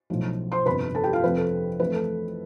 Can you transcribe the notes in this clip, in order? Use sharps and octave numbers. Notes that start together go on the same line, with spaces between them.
B1 A2 F3
C5 C6
G1 F2 C3 B4 B5
A4 A5
G4 G5
F4 F5
F2 C3 F3 B4
A4
F2 E3 A3 B4
A4